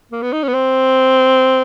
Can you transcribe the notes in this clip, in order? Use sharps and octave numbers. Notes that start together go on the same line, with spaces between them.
A#3
B3
D#4
C#4
B3
C4